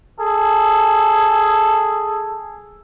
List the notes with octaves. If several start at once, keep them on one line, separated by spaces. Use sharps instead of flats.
G#4 A4